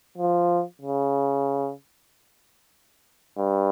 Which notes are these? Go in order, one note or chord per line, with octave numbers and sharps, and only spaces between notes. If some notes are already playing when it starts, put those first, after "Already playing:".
F3
C#3
G2